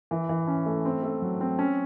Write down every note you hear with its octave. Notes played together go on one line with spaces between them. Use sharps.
E3
E3
C#4
A3
C4
A3
F#3
C4
C#4